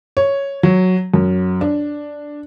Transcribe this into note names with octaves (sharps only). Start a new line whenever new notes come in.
C#5
F#3
F#2
D4